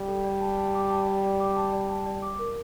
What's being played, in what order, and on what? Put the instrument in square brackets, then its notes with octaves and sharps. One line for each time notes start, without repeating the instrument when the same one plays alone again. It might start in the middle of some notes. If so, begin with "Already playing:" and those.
Already playing: [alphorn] G3
[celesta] A4
D5
A5
A5
D6
A5
D5
D5
D6
A5
D5
A5
D5
D6
A#4